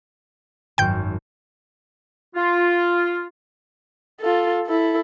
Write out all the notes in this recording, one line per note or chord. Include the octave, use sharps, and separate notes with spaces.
G#1 F#2 G5 G6
F4
F4 A4
E4 A4